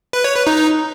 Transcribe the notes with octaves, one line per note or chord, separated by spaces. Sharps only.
B4
C#5
B4
D#4